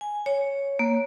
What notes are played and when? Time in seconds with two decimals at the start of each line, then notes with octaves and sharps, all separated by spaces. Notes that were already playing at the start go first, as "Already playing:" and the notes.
0.01 G#5
0.26 C#5
0.79 A#3